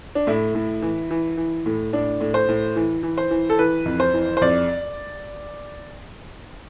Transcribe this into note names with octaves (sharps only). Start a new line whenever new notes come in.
D4
A2 E4
A2
E3
E3
E3
A2
A2 D4
A2
C5
A2
E3
E3
C5
E3
A4
E3 B4
F2
C5
E3
C5
F2 D5